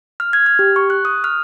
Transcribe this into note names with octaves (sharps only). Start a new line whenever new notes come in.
F6
G#6
F6
G4
C#6
F#6
D#6
F6